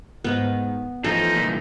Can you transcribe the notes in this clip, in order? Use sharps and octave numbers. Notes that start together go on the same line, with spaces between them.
G#2 D#3 B3 D#4
E3 F3 A3 C#4 D#4 A4
C2 A#2